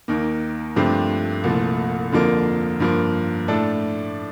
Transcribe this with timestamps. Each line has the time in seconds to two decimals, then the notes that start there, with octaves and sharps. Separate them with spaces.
0.08 D#2 D#3 A#3
0.76 G2 F3 A3 C4 G4
1.44 C2 A#2 F3 A3
2.12 F2 D3 F3 A#3
2.80 G2 F3 A#3
3.48 A2 A3 D4 A4